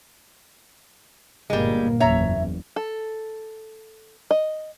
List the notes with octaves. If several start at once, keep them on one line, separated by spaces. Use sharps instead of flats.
G1 A#2 G3 G#3 A#3
F#1 E2 C#5 E5 A#5
A4
D#5